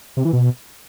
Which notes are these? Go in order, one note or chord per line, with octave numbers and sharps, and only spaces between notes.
C3
E3
B2